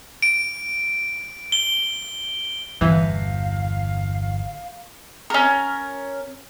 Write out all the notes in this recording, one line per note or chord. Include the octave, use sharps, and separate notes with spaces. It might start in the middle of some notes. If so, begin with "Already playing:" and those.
D7
G7
G1 E2 B2 E3 F5
C#4 A#4